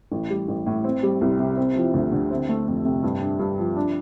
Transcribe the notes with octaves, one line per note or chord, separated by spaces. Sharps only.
A1
G3
A1
A2
C4
G3
C2
C3
C4
F3
D2
D3
C4
A3
F2
C3
G2
D4
G2
F3
D4